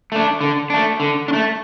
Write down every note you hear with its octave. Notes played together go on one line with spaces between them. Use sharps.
A3 D4
D3
A3 D4
D3
D4
A3